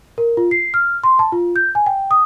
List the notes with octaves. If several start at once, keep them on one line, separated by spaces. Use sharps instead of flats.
A#4
F4
C7
F6
C6
A5
F4
G6
G#5
G5
D#6